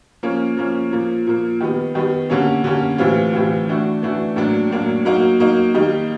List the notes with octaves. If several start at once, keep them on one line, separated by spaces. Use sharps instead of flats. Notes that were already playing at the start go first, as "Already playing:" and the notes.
F3 A#3 C#4
F3 A#3 C#4
A#2 F3 A#3
A#2 F3 A#3
D#3 G3 B3
D#3 G3 B3
D3 G3 A#3 C#4
D3 G3 A#3 C#4
A2 E3 G3 C4 F4
A2 E3 G3 C4 F4
E3 A3 D4 F#4
E3 A3 D4 F#4
A2 F#3 A#3 D4
A2 F#3 A#3 D4
F#3 A#3 D#4 F#4
F#3 A#3 D#4 F#4
D#3 G3 A#3 D#4